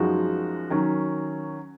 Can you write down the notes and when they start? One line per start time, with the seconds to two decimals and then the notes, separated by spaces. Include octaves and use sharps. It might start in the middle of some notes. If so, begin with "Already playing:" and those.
Already playing: F#2 F3 G#3 D#4 F#4
0.70 D#3 F#3 C#4